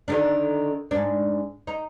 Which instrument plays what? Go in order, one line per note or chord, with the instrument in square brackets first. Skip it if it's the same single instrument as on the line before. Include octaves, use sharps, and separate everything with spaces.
[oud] D3 D#3 D4
G#2 D4
D#4